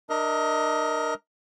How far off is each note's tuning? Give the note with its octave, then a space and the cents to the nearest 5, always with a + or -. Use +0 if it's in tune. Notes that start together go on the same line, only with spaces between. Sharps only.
D4 +35 A#4 +0 D#5 +30